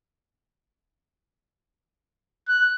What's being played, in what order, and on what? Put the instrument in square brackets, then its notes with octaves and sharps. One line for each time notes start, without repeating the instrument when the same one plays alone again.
[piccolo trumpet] F#6